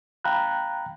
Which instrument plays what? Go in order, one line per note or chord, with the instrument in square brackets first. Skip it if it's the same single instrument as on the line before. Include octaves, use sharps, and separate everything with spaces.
[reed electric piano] F5 G5 A#5 B5 F#6